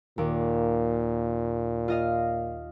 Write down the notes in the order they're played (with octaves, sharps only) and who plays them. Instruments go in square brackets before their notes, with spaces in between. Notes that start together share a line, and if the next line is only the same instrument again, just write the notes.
[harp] D#2 D6 [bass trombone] A#2
[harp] F4 D#5 F5